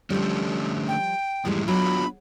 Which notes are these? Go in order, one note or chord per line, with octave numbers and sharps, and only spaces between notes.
D3 F3 G3 A3 C#4
G5
F#2 A2 D#3 E3 G3 G#3
F#3 B3 D4 F4 B5